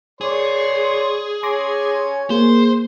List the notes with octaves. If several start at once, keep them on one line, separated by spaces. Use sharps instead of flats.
G#4 C#5 D5 C6
C#5 G#5 C6 D6 A#6
A#3 G#4 C5